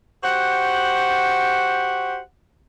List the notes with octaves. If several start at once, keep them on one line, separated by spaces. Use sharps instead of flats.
F#4 G4 C5 F#5